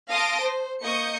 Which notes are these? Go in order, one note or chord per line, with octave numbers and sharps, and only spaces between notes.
F5 A5 C6 D#6 A#6 D7
C5
A#3 D#5 C#6 D#6 G6 C#7